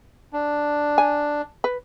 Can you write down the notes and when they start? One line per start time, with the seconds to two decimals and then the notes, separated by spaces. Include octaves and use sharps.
0.33 D4
0.98 G#5
1.64 B4